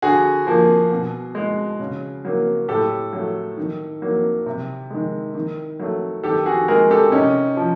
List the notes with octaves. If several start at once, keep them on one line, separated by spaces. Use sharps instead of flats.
D3 F#4 G#4
F3 A#3
B2
G#3
C#3
F#3 A#3
A2 G4 A4
F#3 A3
D#3
F#3 A#3
C3
D#3 G#3
D#3
F#3 A3
D#3 G4 A4
F#4 G#4
G#3 G#4 A#4
G4 A4
C3 C#4 D#4
F3